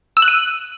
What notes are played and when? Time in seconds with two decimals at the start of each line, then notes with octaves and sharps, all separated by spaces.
0.17 E6
0.22 F#6
0.28 D#7